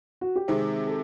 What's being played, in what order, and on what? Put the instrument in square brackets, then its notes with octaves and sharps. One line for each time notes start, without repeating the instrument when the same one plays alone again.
[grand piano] F#4
G4
[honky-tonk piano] C3 D#3 G#3 C4 [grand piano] G#4
[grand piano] A4